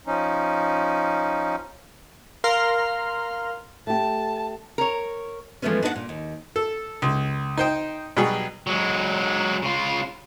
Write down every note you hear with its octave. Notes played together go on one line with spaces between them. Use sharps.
F3 C#4 D#4
A#4 F5 A#5 C6 F6
A3 G4 A5
A#4 C#5
E3 F3 G#3 A3 B3 C#4
D4 D#4 A4 B4 D#5 F#5
A#2
D#2
A4
C#2
D#4 C5 G5
B2 F#3 G3 G#4
F#3 G#3
C#3 F4